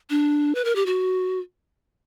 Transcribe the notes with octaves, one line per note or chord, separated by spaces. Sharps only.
D4
B4
A#4
G4
F#4